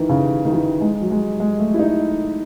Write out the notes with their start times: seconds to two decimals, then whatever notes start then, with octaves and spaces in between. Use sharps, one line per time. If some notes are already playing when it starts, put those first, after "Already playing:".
Already playing: D#3 E3
0.09 C#3
0.45 D#3
0.52 E3
0.81 G#3
1.01 F#3
1.11 G#3
1.40 G#3
1.59 A3
1.74 E4
1.79 D#4